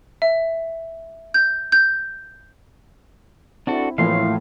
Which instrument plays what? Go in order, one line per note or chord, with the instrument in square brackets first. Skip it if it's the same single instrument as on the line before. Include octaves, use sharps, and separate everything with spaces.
[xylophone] E5
G6
G6
[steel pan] C4 E4 [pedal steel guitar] D4 F#4 A4
[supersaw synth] A2 [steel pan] E3 F3 A#3 [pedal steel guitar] F5 C6